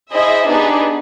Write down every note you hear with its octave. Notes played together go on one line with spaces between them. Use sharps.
E4 G#4 C5 D#5 E5
B3 D4 D#4 G4 G#4 B4